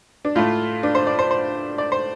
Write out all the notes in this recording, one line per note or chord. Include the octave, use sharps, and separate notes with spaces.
D4
A2 A3 F4
D4
C5
D5
C5
C5
D5
C5